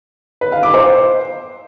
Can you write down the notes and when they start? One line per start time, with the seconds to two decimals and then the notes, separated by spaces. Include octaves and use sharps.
0.41 B4
0.52 F5
0.63 D6
0.74 C5